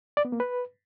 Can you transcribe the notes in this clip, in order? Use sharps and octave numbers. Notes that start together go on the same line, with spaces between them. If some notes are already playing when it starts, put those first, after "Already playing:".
D5
B3
A#3
B4